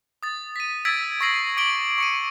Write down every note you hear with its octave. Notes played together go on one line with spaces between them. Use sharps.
D#6 A6
B6 D#7
E6 G#6 A6 B6 D7
C#6 E6 A#6 C7 F#7
D6 A#6 D7 F#7 G7
C#6 C#7 D#7